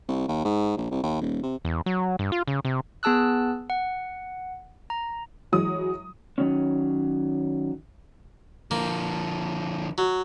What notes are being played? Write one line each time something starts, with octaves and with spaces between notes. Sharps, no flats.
C2
D#2
G#2
A#1
C2
D#2
D#1
C3
E2
F#3
G2
F4
C#3
C3
B3 G#4 A5 E6 F#6
F#5
A#5
E3 F#3 G#3 D#6
D#3 F#3 C#4
D3 F3 A#3
F#3